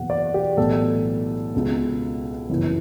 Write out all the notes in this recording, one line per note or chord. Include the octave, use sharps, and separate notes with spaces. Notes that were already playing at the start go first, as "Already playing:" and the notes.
Already playing: F#1 E2 B2 F#5
D5
G4
B1 A2 E3 A4
C#2 B2
G1 F#2 C#3 E3